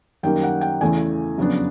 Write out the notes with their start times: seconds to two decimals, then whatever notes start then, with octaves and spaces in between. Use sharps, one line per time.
0.23 F#2 D#3 G3 A#3 G5
0.43 F#5
0.61 G5
0.81 E2 C#3 E3 A3 G#5
1.38 F2 C#3 F#3 B3 D4